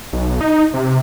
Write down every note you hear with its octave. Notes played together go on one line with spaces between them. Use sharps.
B1
D#4
C3